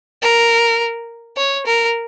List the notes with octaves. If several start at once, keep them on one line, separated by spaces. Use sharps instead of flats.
A#4
C#5
A#4